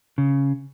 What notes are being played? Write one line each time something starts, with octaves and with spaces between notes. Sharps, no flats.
C#3